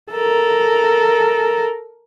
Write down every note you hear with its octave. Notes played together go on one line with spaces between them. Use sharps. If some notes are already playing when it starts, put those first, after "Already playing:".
A4 A#4